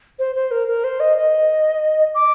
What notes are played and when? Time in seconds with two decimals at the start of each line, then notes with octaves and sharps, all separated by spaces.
0.19 C5
0.36 C5
0.51 A#4
0.68 A#4
0.84 C5
1.00 D#5
1.17 D#5
2.15 D6